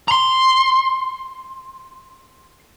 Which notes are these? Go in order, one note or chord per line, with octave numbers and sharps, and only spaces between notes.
A#5 C6